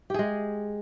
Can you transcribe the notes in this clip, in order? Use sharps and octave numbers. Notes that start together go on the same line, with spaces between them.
G#3 G4 G#4